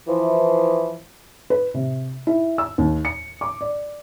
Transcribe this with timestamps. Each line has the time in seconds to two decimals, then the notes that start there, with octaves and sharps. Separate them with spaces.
0.08 E3 F3
1.50 B4
1.74 C3
2.27 E4
2.58 E6
2.78 D#2
3.05 C#7
3.41 D6
3.61 D5